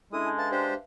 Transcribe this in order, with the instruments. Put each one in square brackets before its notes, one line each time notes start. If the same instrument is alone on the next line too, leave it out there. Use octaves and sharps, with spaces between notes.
[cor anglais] G#3 [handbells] C#4 D4 A4 [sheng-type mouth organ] E4 D#6
[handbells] G#5 A5 G6
[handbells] B4 E5 F5 [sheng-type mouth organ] A5
[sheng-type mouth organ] D4 G4 C5